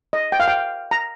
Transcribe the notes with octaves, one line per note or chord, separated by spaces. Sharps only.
D#5
G5
F5
G5
A#5